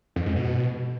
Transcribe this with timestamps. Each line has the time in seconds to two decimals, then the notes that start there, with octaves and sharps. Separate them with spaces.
0.16 F2
0.26 G#2
0.36 B2